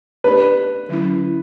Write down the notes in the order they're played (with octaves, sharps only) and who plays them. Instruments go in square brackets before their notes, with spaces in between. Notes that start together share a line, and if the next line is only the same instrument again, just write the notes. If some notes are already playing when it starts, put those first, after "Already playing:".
[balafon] B3 D4 G4 D5 [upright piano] B4
[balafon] D3 F#3 C#4 E4